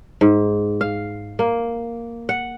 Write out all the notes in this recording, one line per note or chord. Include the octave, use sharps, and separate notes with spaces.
G#2
F5
A#3
F#5